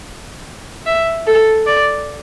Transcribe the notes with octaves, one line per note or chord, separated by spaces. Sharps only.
E5
A4
D5